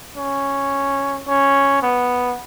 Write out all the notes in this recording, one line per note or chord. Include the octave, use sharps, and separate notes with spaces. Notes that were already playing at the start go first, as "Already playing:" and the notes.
C#4
C#4
B3